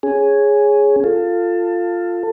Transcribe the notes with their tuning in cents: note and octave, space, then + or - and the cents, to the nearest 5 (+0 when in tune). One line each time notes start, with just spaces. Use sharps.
C#4 +0 G#4 +0
F4 +0 A4 +20